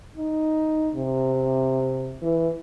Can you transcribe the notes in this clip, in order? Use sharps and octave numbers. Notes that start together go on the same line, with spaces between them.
D#4
C3
E3